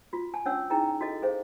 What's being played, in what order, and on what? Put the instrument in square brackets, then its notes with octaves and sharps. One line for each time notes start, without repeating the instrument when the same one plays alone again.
[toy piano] F4 F#4
G#5 A5
C#4 D4 C#5 F#5 E6
D#4 E4 G#4 G5 A#5
F#4 A4 D#5
G#4 C5 F5